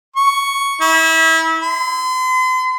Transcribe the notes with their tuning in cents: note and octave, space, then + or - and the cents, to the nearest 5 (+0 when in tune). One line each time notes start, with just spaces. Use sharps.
C#6 +5
E4 -30
C6 -40